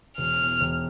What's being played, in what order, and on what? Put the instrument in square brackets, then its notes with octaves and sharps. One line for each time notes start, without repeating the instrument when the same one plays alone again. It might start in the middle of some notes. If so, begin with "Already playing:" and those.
[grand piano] E1 [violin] F6
[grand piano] E2
E1